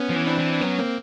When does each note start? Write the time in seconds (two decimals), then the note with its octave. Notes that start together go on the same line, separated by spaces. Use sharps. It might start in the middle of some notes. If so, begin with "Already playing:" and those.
Already playing: B3 C#4
0.10 F3
0.16 E3
0.27 C4 D4
0.39 E3
0.53 D4
0.61 F#3 B3 C#4
0.79 A#3 C4